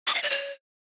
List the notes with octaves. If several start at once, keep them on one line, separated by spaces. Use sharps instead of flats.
D6
F5
D5
C#5